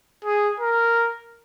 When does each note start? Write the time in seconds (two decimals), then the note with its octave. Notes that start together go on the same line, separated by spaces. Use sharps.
0.25 G#4
0.60 A#4